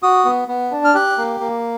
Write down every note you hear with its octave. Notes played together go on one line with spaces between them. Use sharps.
F#4 D#6
B3
B3
D4
F6
G4 F#6
A#3
A#3